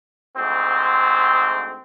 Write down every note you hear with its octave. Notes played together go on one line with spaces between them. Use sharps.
D2 G#2 C4